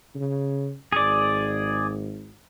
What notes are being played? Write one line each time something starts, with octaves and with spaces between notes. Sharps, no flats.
C#3
G#1 G#4 D5